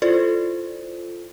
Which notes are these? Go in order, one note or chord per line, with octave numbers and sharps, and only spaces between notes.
E4 F4 A4 C5 D5